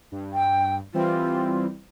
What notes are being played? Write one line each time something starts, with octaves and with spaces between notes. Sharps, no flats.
G2
G5
E3 G3 C4 F4